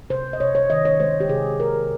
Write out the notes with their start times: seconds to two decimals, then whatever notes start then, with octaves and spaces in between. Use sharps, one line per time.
0.10 C3 C5
0.33 D#5
0.40 C3 C#5
0.55 C#5
0.70 D#3 D#5
0.85 C#5
1.00 G#3 C5
1.20 G4
1.29 C3 G#4
1.60 C3 A#4